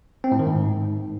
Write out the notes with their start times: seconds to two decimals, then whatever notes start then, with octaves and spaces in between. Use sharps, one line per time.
0.24 C4
0.32 A2
0.39 D#3
0.47 G#2